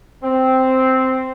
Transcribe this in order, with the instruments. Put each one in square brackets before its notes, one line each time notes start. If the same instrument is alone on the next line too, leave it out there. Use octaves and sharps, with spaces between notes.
[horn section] C4